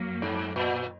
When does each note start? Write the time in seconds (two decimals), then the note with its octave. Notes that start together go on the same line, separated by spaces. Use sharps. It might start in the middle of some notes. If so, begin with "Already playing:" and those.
Already playing: F#2 F#3 A#3
0.22 G#2
0.56 A#2